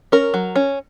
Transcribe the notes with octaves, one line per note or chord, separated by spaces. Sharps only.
C#4 A#4
F#3
C#4